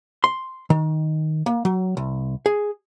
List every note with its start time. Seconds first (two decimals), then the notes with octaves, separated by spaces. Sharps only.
0.24 C6
0.70 D#3
1.46 A#3
1.65 F#3
1.97 C2
2.46 G#4